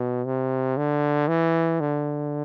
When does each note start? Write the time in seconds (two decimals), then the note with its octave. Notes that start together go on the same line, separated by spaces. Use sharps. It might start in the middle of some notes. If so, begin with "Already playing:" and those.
Already playing: B2
0.25 C3
0.77 D3
1.28 E3
1.80 D3